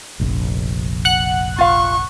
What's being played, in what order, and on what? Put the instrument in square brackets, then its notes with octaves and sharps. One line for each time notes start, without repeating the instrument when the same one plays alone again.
[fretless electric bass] F1 A#1
[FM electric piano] F#5 F#6
[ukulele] F4 F5 [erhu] C#6